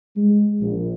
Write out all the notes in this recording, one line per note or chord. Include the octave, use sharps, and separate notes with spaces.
G#3
A#1